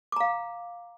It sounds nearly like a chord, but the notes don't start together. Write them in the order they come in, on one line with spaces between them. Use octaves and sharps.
D6 A#5 F5